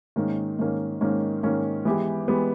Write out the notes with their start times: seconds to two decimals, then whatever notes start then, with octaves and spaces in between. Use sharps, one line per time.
0.16 G#2 D#3 A#3 C#4
0.59 G#2 D#3 A#3 C#4
1.01 G#2 D#3 A#3 C#4
1.43 G#2 D#3 A#3 C#4
1.85 E3 G#3 B3 G4
2.28 E3 G#3 B3 G4